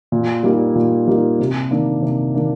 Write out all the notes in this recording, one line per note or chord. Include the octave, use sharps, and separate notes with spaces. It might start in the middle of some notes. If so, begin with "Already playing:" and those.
A#2
G3 A#3 D#4
A#2
G3 A#3 D#4
C3
D#3 A#3 D4
C3
D#3 A#3 D4